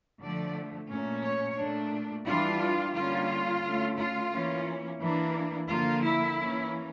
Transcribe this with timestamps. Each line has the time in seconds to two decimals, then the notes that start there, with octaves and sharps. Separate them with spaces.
0.21 D3 F3 A3 D5
0.89 A#2 A3 C#4
1.24 C#5
1.57 A#2 A3 D4
2.26 E3 G3 D4 F4
2.95 D3 G3 A#3 C#4 F4
3.63 D3 A3 C#4
3.98 F4
4.31 E3 A#3 C#4
5.00 E3 A#3 D4
5.68 D3 F3 A#3 F4
6.03 E4
6.37 E3 A#3 C#4